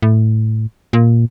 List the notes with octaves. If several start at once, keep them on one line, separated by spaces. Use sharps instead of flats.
A2
A#2